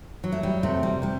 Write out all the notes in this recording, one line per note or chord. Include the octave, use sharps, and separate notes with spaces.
F#3
A3
G3
C3 A3
G3
C3 G3